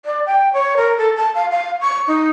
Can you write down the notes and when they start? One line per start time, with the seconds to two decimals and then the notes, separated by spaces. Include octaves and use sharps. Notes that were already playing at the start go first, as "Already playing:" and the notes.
0.05 D5
0.26 G5
0.53 C#5
0.77 A#4
0.98 A4
1.16 A5
1.35 F5
1.51 F5
1.81 C#6
2.08 D#4